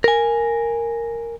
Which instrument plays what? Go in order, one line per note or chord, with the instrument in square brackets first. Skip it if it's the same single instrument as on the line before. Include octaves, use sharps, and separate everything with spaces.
[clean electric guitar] A#4 G#5